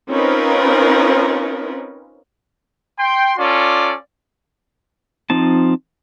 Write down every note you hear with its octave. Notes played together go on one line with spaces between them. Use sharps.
C4 C#4 D#4 F4 A#4 B4
G5 C6
C#4 F4 A4 D5
F3 C4 D#4 A5